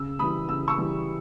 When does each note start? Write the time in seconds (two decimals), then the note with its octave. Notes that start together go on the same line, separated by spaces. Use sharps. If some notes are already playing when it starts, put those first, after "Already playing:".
Already playing: C#3 E6
0.19 E3 G3 B5 D#6
0.49 C#3 E6
0.68 C#6 E6
0.78 E3 G3